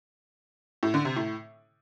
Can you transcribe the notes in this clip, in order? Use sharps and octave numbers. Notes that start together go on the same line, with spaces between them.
A2
D3
C3
A2